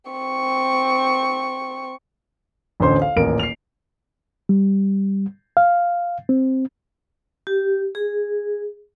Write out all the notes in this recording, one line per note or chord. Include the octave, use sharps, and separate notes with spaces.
C4 C#6
A1 D2 C#4 C5 C6
F5
D#1 A1 A#4 D7
C7 F7
G3
F5
C4
G4
G#4